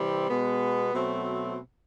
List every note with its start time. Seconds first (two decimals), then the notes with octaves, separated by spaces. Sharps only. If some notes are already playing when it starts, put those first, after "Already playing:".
Already playing: C3 E3 G3 C4
0.29 B2 G#3 B3
0.93 B2 F#3 A3 C4